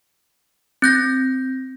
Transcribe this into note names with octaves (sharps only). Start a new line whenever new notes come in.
C4 G6 A#6